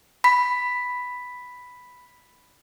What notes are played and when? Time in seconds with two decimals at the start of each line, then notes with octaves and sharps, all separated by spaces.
0.24 B5 B6